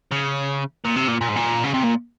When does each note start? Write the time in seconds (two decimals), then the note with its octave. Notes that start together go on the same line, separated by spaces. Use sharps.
0.11 C#3
0.85 A#2
0.96 C3
1.08 A#2
1.21 A#2
1.29 G#2
1.36 A#2
1.64 C#3
1.74 C3
1.84 A#2